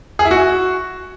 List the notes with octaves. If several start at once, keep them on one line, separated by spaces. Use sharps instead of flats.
G#4
E4
F#4